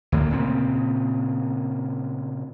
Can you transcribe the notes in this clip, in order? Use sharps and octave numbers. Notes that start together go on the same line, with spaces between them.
D2 A2 E3 A#3
A#2 C#3 C4